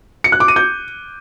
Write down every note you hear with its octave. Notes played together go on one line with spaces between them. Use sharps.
C#7
F#6
D6
D#7
G6